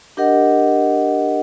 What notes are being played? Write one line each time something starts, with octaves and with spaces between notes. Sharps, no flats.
D4 G4 A#4 D#5 F#5